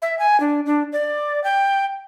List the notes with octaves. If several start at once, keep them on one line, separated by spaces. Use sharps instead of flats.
E5
G#5
D4
D4
D5
G5